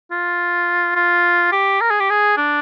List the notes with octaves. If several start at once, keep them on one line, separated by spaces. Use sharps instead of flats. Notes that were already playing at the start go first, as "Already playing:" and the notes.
F4
F4
G4
A#4
G#4
G4
G#4
D4